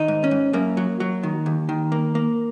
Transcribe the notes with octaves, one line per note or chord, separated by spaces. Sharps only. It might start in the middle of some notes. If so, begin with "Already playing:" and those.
Already playing: D#3 D#4
G#2
C#4
G#2
F#2 A#3
F#3
F#3
D#3
D#2
D#3
A#3
A#3